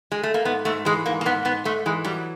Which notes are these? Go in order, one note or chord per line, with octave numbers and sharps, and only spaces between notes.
G#3
A3
A#3
G#2 B3
G#2 A3
E3 G#3
G#2 A#3
A#3
G#2 B3
G#2 B3
G#2 A3
E3 G#3
F#3 G3